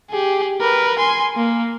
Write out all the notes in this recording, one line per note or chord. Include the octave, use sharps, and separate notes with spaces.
G4 G#4
A#4 B4
G#5 C6
A#3